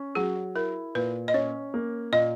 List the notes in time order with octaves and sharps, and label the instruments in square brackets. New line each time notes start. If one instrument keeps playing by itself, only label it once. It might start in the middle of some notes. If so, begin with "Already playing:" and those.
Already playing: [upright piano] C#4
[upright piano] F#3 [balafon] G#4
[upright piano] E4 [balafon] A#4
[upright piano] A#2 [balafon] B4
[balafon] D#5
[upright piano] C#4 [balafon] C#5
[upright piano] A#3
[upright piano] A#2 [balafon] D#5